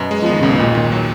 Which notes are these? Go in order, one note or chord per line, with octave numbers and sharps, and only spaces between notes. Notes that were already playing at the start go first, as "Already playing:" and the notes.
Already playing: F#2 B2
G#3
F3 B3
D#3
B1 C#3
B2
D#2 A#2
D#3
F#3